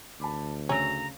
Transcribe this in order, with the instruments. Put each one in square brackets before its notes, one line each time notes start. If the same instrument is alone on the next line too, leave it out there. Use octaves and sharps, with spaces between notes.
[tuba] D2 [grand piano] A5 B5 D6
[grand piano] C#3 E6 F7 [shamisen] F#3 C#4 [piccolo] A#5